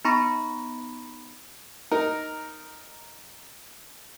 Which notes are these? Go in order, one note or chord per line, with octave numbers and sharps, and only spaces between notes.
B3 D#4 A#5 B5 C#6 A#6
D#4 A#4